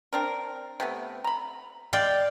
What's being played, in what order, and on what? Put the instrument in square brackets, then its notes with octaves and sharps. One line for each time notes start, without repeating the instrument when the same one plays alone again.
[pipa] C4 D4 A#4
C3 A3 B3
A#5 B5
[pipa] G#3 [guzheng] D5 F5 G5